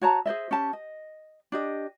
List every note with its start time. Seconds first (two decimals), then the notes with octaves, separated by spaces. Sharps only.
0.01 F#4 C#5 A5 A#5
0.26 G#4 C5 D#5 E5
0.51 C#4 G4 A5
0.73 D#5
1.52 D4 G4 D#5